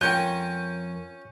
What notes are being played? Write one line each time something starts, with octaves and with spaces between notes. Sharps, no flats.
F2 C#4 F4 A#4 G5 G6